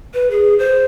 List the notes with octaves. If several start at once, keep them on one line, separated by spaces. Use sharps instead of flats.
B4
G#4
C5